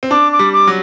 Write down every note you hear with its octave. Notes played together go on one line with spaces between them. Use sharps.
C4
D4 D6
D6
G3
D6
F#3